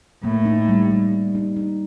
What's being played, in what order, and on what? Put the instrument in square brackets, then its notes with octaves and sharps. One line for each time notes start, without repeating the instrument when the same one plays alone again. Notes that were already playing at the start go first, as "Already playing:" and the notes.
[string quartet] A2 [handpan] A#3
[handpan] D#4
G3
G3
D#4
D#4
D#4